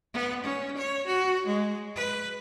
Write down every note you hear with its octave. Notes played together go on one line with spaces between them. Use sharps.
B3
C#4
C#5
F#4
G#3
B4